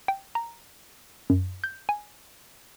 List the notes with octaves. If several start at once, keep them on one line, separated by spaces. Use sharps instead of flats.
G5
A#5
F#2
G6
G#5